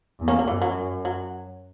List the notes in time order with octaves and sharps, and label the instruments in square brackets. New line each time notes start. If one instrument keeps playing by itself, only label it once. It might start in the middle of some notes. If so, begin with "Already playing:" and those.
[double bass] E2
[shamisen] A#3 C#4
A#3
[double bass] F#2 [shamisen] E3
[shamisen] F#3
F#3